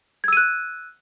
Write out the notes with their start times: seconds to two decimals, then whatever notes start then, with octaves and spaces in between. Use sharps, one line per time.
0.24 G#6
0.28 E6
0.33 D#7
0.37 F#6